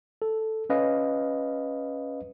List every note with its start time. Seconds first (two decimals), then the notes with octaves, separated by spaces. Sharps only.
0.22 A4
0.70 C#4 B4 D#5 F5